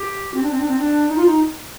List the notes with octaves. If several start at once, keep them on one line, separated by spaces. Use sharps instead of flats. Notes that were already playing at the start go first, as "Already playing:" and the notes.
Already playing: G4
C4
D4
C4
D4
C4
D4
D#4
F4
D#4